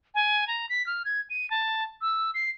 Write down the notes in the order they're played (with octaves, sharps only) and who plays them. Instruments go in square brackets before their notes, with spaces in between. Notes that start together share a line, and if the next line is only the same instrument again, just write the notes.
[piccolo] G#5
A#5
B6
F6
G#6
D#7
A5
E6
C7